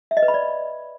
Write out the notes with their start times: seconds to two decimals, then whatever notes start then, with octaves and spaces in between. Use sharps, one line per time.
0.11 E5
0.17 D#5
0.23 B4
0.28 B5
0.34 D5